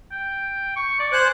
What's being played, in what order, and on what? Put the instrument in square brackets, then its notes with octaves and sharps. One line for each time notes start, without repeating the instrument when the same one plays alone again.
[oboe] G5
C#6
D5
[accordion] C5 F#6 [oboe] G#5